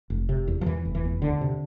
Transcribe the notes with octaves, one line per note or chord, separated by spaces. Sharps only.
F1
C3
E2
F3
E2 E3
F1
E3
E2
D2 D3
C3